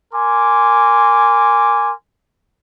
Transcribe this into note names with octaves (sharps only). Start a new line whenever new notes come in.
A#4 G#5 C6 D6